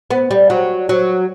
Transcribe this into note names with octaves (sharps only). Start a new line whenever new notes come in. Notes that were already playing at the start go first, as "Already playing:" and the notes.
B3
G3
F#3
F#3